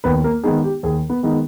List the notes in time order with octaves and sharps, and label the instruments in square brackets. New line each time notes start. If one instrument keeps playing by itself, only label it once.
[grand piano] D#2 B3 B4
A#3 A#4
D#3 G#3 B3 D#4 G#4
G4
D#2 G#4
B3 B4
D#3 G#3 B3 D#4